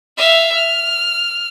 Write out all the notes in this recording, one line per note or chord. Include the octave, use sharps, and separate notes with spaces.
E5 F5
F6